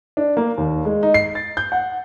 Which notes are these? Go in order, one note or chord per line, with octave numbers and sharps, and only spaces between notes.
D4
A#3
D#2
G#3
D#4
C7
A6
G6
F#5